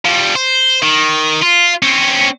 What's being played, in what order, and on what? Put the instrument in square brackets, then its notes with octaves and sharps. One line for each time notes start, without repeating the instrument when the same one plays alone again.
[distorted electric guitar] F3 G3
C5
D#3
F4
C4 C#4